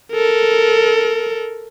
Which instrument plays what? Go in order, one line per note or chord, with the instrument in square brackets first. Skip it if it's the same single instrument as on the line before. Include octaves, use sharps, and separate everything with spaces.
[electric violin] A4 A#4